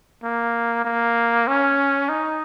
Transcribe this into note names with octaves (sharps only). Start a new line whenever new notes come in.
A#3
A#3
C#4
D#4